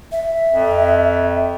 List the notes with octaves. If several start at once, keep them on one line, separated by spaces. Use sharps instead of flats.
E5
F2